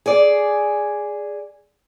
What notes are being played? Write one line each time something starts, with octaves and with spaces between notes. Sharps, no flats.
G#4 D5